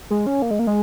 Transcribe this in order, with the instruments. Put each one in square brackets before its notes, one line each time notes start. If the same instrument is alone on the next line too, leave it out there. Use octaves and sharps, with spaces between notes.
[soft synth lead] G#3
C#4
A#3
G#3
A#3
G#3